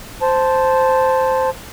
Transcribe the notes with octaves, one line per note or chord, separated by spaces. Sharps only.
C5 A5